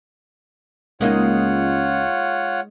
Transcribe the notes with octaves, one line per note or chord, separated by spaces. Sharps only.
C#2 G#3 A#3 D#4 F4 C#5 F#5